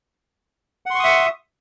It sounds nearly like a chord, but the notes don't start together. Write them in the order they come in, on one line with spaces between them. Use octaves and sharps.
F#5 C6 C#6 D#6 E5